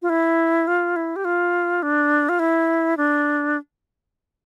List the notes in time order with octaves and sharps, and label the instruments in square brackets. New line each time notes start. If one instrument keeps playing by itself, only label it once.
[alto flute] F4
E4
F4
E4
G4
F4
D4
F4
E4
D4